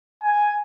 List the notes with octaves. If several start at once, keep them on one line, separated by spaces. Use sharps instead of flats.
G#5